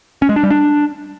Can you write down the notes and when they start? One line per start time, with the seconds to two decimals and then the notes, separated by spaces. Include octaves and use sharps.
0.22 C#4
0.29 G#3
0.36 D4
0.43 G3
0.50 D4